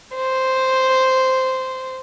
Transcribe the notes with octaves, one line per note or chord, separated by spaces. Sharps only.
C5